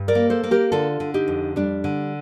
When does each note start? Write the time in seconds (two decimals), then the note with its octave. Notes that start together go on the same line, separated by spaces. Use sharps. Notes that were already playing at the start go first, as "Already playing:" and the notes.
Already playing: G2
0.08 A#4 D5
0.15 A#3
0.30 A4 C5
0.43 A#3
0.51 G4 A#4
0.72 D3 F4 A4
1.00 D3
1.14 D#4 G4
1.28 F2
1.56 G3 D4
1.84 D3